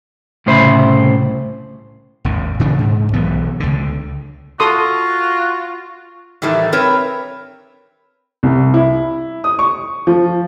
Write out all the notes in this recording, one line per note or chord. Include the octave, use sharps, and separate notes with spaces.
C2 A2 C#3 C5 E5 B5
G#1 D#2
A#2 C#3 E3 D4
G#2
B1 E3 B3
C#2 D3
F4 F#4 A4 C6 D#6
A2 D#3 E3 G3 A3
C4 A#4 B4 C#5
C2
E4
D#6
C#6
F3